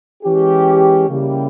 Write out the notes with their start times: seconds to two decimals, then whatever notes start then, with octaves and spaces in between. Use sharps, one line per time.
0.23 E3 G#3 C#4 G4
1.08 C#3 G3 A#3 E4 G4